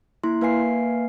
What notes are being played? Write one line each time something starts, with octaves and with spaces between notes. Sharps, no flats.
A#3 E4 C6
A#3 B4 F5 G#5 C7